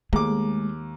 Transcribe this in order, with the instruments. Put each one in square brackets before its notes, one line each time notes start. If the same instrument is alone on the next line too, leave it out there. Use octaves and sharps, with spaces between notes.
[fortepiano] D#2 D6 [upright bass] G#3 [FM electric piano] A3 G#4